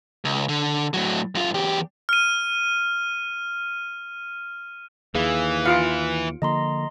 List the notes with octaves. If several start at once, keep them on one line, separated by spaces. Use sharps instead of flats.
C#2
D3
A2 F#3
F#2 F4
E2 G4
F6 D#7
D#2 E3 G#4 F5
F4 F5 C#7 D7
D3 F3 A#3 D#5 A#5 C6